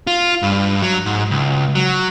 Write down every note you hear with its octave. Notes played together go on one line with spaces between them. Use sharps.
F4
G2
F#3
G#2
C#2
F#3